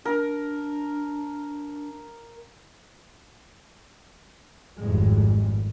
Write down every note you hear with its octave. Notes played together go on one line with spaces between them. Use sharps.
D4 A#4
G#1 F2 A2 G3 G#3